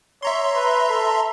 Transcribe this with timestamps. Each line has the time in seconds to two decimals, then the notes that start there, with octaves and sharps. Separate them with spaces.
0.22 C#5 E5 A#5 C6
0.55 B4
0.89 A4